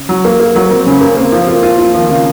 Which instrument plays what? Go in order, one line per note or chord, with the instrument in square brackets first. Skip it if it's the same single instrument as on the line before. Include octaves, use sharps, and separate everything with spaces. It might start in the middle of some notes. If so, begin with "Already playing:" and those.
Already playing: [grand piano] C#3
[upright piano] F#3
A#3
A#3
[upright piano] F#3 [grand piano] A#3
[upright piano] F#3 [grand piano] C4
[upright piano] C#3 [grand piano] C#4
[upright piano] A#3 [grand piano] C4
[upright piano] A#3 [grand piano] C4
[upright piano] F3
[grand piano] C4
[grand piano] A#3 [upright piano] F4
[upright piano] F4
[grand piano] F3 [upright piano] F4
[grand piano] D#3 [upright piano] F3
[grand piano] C#3 [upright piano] F3